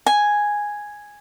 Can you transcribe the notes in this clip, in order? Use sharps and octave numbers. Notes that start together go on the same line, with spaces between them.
G#5